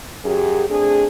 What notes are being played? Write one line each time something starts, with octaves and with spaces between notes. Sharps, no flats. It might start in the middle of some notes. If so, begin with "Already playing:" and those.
F#2 G4 G#4
A3 C4 D4 G#4